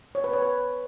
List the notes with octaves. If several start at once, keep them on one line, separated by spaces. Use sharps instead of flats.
C#5
B4
C#5
B4